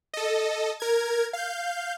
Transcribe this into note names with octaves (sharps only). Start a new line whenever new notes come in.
A4 D#5
A#4 G#6
F5 G6